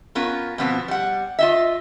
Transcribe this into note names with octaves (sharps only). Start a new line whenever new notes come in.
B3 C#4 F4 A#4
B2 F3 B3 C4
G3 F#5
F4 D#5 E5